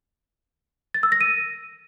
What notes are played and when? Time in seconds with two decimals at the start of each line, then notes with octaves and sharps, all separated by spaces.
0.94 A6
1.03 E6
1.12 A#6
1.21 D#7